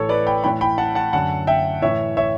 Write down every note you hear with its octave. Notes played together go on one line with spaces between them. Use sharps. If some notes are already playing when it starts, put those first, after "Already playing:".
Already playing: A2 E3 A4 C#5
B4 D5
G5 B5
A2 E3 G5 B5
G5 B5
F#5 A5
F#5 A5
F#2 D3 F#5 A5
E5 G5
A2 E3 C#5 E5
C#5 E5